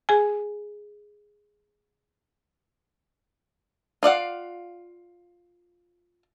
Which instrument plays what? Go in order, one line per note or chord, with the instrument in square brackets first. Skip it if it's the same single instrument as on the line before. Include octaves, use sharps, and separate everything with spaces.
[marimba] G#4 G#5
[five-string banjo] F4 D5 F5 F#5